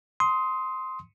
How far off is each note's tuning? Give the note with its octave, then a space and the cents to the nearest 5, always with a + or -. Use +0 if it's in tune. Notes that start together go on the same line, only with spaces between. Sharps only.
C6 +0 D#6 +25